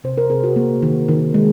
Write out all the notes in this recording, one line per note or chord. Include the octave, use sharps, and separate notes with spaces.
C3 C5
A#4
C3 G#4
F#4
A#3
D#3
D#3
G#3